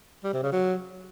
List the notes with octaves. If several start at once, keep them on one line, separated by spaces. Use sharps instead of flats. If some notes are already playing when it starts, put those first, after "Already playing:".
G3
C3
C#3
F#3